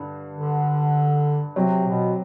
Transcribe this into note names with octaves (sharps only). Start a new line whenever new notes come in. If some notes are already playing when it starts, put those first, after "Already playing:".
Already playing: G2 D3
D3
C3 F#3 C4 G4
B2